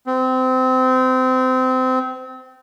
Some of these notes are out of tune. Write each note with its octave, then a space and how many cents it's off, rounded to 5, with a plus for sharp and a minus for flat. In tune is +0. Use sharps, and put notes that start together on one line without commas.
C4 -25